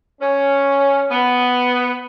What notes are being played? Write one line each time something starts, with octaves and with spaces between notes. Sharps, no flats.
C#4
B3